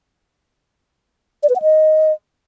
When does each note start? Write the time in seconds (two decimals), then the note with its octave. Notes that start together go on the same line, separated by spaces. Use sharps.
1.43 D5
1.49 B4
1.56 F#5
1.62 D#5